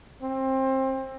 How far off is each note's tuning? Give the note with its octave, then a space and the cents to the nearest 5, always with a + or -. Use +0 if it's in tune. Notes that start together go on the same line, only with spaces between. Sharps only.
C4 +25